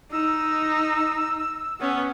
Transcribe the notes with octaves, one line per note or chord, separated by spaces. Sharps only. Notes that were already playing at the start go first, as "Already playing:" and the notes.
D#4 E6
B3 C#4